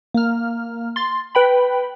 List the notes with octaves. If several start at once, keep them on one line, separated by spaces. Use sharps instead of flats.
A#3 F6
C6 A6
B4 G5 B5